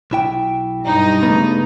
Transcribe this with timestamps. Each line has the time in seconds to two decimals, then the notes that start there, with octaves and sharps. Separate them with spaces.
0.11 B1 E4 G5
0.84 G2 D#4
1.23 C#3 A3 B3